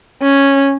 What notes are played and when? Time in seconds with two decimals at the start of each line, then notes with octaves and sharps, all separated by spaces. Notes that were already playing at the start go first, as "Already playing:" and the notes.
0.22 C#4